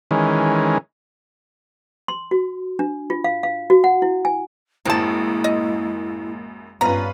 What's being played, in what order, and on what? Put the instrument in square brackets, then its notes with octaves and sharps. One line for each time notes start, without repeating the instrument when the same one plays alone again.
[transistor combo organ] D#3 E3 G#3 C#4
[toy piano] C6
F#4
D4
F4
F5
F5
F#4
F#5
E4
G#5
[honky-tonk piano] A1 F#2 [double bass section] G#3 A#3 [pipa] C4 A5 [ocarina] E4
[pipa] D#5
[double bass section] G2 G3 C#4 [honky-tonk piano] B3 F4 B4 [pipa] A#5